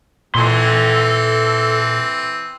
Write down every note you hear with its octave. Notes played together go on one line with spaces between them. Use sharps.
A#2 E3 C4 A4 C6